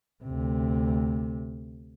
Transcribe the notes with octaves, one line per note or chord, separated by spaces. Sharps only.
D2 C3